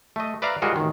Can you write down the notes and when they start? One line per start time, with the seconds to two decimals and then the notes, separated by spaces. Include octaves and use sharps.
0.16 A3 D#5
0.42 B4 D5 E5 F5 A#5
0.62 G3 G#3 F4 F#4 A#4
0.76 A1 D#3